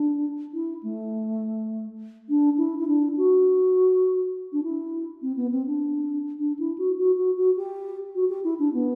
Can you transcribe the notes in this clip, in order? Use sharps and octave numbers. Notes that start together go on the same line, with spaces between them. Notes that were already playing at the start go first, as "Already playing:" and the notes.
Already playing: D4
E4
A3
D4
E4
E4
D4
F#4
D4
E4
C4
B3
C4
D4
D4
E4
F#4
F#4
F#4
F#4
G4
F#4
G4
E4
D4
B3